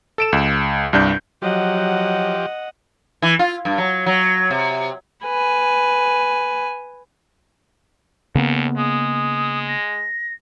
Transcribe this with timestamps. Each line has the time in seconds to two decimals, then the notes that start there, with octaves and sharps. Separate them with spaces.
0.18 A4 D7 E7
0.32 C#2
0.93 C2 G2 D4 G6
1.42 F3 F#3 G4 D#5 F#5
3.22 E3
3.39 F4
3.65 G2
3.78 F#3
4.06 F#3
4.51 C3
5.25 B4 G#5
8.35 D#2 C#3 A#3 B3
8.77 G#3 D#6
9.67 A#6